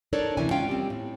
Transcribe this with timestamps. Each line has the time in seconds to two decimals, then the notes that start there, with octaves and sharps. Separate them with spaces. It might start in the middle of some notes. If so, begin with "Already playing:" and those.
0.13 D4 D#4 A4 A#4 C#5 D5
0.37 D2 C3 E3 C#4 E4 G#5
0.51 G#3 C#4 F4 F5 G5
0.69 G3 C4
0.90 A2